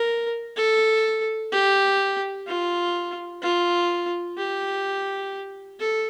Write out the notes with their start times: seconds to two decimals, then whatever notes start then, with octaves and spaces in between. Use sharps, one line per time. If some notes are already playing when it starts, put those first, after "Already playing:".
Already playing: A#4
0.57 A4
1.52 G4
2.47 F4
3.42 F4
4.37 G4
5.80 A4